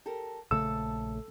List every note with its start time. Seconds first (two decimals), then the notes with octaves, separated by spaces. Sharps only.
0.06 G4 A4 A#4
0.51 A#1 C#3 A3 A4 E6